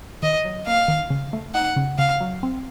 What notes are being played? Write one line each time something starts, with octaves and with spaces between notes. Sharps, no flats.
D#3 D#5
F#3
A#3 F5
D#3
C#3
A3
D#4 F#5
C#3
C#3 F5
F#3
C4